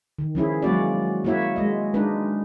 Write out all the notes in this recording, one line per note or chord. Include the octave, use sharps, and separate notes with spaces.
D#3
F3 C#4 E4 G#4
F#3 G#3 A#3 C#4 F#4 D5
A#3 E4 F#4 C#5 E5
G#3 D#5
G#3 D4 D#4 B4